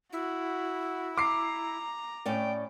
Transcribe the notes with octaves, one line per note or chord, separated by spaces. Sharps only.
E4 F#4
A#5 D6 C7
A2 C#4 D5 G5